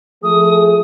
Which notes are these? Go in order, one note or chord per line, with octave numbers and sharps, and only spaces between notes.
F3 A3 G#4 D#6